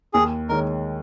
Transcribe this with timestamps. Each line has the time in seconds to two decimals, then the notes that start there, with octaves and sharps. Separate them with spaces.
0.13 D#2 G#4
0.49 D#3 G#3 D#4 A#4 C#5